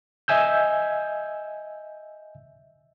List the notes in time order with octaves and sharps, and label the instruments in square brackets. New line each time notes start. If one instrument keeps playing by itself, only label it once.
[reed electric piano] D#5 E5 G#5 E6 G6